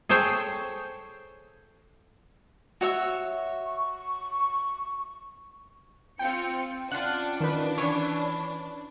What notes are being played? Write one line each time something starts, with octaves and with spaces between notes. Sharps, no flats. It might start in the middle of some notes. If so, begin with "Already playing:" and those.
G#4 A4 C5 C#5 G5
F#4 C#5 E5
C#6
C4 F4 G5 C#7
C#4 D4 F4 F#5
D#3 B4
E3 C#5